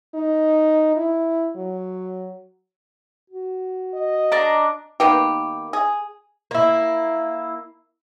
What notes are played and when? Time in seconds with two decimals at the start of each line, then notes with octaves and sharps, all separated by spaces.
0.14 D#4
0.96 E4
1.56 F#3
3.30 F#4
3.94 D#5
4.32 D4 D5 A#5
5.00 D#3 A#3 B3 G4
5.73 G#4
6.51 A#3 E4